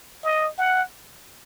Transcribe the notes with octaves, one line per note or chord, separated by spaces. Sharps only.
D#5
F#5